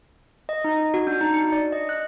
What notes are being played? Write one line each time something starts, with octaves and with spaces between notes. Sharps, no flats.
D#5
D#4
F#4
D4
D#4
C#7
D5
D#5
F#6